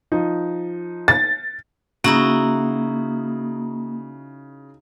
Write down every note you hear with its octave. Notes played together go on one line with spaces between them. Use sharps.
F3 D#4
A6
C#3 A#3 D#4 E4 F#4